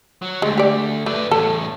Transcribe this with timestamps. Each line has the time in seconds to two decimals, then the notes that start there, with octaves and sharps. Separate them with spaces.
0.22 F#3
0.42 D2 G#3
0.58 G4 D5
1.06 A3 B4 D5
1.31 E2 A2 A4